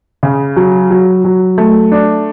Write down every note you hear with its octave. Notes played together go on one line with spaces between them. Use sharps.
C#3
F#3
F#3
F#3
A3
D4